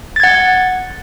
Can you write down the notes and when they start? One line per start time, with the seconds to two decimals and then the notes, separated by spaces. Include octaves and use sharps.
0.16 A6
0.20 G#6
0.24 F#5